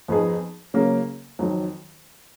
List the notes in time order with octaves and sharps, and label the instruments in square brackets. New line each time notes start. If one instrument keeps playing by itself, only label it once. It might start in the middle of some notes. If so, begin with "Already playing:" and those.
[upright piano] F2 F3 B3 D#4 G#4
C#3 F#3 A#3 C#4
F2 D#3 F#3